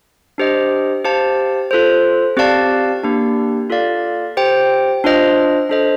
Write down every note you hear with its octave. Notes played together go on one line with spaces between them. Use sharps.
D4 G4 C5 D#5
G4 C5 F5 A5
F4 A4 C5
C4 G4 D5 F5 A5
A#3 D4 G4
F4 A4 D5 F5
G4 C5 G5
D4 F4 C5 D#5
D4 A4 C5 D#5